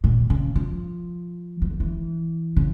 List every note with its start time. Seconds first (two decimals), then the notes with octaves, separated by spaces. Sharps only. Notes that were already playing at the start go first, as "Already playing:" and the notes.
0.04 A#2
0.30 C#3
0.56 F3
1.62 E3
1.70 F3
1.80 E3
2.56 C#3